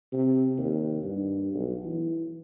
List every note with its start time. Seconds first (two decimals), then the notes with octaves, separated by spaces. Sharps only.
0.13 C3
0.58 D#2
1.03 G2
1.54 B1
1.85 E3